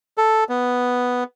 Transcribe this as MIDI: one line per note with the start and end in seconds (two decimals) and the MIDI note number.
0.18 0.44 69
0.49 1.24 59